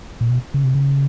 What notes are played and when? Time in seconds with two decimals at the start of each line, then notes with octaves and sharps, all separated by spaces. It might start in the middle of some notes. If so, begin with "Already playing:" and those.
0.21 A#2
0.30 B2
0.54 C#3
0.64 C3
0.75 C#3